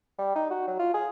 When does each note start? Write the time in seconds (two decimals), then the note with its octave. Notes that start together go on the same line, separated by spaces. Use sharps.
0.18 G3
0.35 D#4
0.51 F#4
0.67 F#3
0.79 F4
0.94 G#4